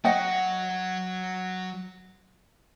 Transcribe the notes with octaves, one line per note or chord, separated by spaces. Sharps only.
F#3 F#4 D#5 F#5 G5